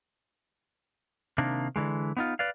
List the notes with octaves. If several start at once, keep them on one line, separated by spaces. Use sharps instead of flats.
C3 D#3 A#3 D4
D3 E3 G#3
B3 D#4 F4
B4 D5 F5